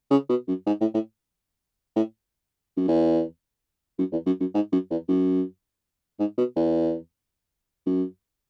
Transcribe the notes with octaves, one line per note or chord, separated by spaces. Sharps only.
C#3
B2
F#2
G#2
A2
A2
A2
F#2
E2
F#2
E2
F#2
F#2
G#2
F#2
E2
F#2
G#2
B2
E2
F#2